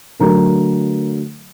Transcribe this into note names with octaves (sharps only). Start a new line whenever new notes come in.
D3 F#3 A3 A#4 A#5